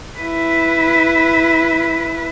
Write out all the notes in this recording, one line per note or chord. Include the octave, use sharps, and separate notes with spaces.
E4 B4